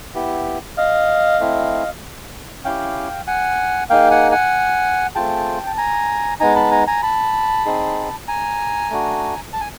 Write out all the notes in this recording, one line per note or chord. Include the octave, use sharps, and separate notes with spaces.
B3 E4 G4
D#5 F5
A3 C4 E4
C#4 E4 G4 F5 G5
F#5 G#5
A#3 D#4 G#4 F5 G5
F#5 G#5
F#5 G#5
A3 C4 F4 G#4 G5 A5
A5
G#5 A#5
G#3 B3 D#4 G#5 A#5
A5 B5
G#5 A#5
G#5 A#5
A5 B5
C4 D#4 G#4
G#5 A#5
A3 D4 F#4
A5
G#5